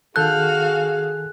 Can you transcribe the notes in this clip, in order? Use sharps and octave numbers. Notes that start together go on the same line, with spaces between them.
D#3 F#4 G#4 A4 F5 F#6 G6